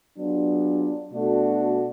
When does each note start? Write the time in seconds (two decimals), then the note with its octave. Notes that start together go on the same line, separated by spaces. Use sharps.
0.17 F#3 B3 D4 F4 G#4
1.13 B2 A3 D4 F#4 A4